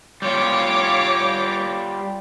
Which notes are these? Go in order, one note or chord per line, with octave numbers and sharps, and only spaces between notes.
G3 F4 C#5 D6